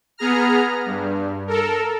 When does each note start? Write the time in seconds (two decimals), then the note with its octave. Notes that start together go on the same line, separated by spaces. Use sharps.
0.18 B3 G#4 A#5 F6
0.86 G2
1.47 A4 A#4